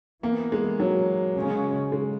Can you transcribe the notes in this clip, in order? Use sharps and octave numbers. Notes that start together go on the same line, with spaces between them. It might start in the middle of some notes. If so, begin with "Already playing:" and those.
E3 A#3 B3
G#3
F#3
C#3 G#3 C#4
G#3